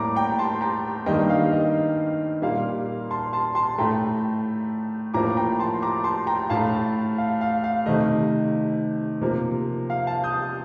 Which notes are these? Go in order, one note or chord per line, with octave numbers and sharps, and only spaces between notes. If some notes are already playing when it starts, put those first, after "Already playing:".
Already playing: A2 G3 A#3 A#5 D6
G5 A#5
A5 C6
G5 A#5
G2 D#3 G3 A#3 D#5 G5
F5
D#5
A#2 G3 A#3 F5
A5 C6
A5 C6
A5 C6
A2 A3 G5 A#5
A2 F3 A#3 A#5 D6
G5 A#5
A5 C6
A#5 D6
A5 C6
G5 A#5
A2 A3 F5 A5
F5
F5
F5
C3 D#3 A3 D#5
C3 F3 A#3
F5
F5 A5
D#6 G6